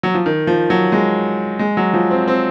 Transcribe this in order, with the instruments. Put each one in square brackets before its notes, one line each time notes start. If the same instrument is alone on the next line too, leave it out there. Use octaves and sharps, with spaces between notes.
[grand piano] F#3
F3
D#3
F3
F#3
G#3
G#3
F#3
F3
C4
C4